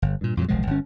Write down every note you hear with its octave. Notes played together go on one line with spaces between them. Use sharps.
G1
G2 A#2
F2 A#2 D3 F#3
D#1 B1 F3 G#3
G1 C#4